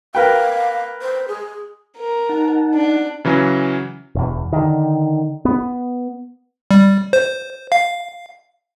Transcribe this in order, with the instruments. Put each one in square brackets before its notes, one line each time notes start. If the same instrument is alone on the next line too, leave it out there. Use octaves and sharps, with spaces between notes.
[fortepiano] A#4 B4 G5 [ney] F5
[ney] C5
G#4
[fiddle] A#4
[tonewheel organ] D#4 F#5 A5
[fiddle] D4
[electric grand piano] C#3 E3 F#3 C#4
[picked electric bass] E1 E2
D3 D#3
B3
[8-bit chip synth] G3
C5
F5